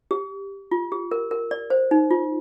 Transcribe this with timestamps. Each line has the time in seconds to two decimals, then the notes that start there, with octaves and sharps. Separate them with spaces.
0.11 G4
0.71 F4
0.92 G4
1.11 A#4
1.31 A#4
1.51 D5
1.70 C5
1.91 D#4
2.11 F4